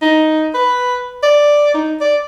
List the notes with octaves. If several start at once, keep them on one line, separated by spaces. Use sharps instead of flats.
D#4
B4
D5
D#4
D5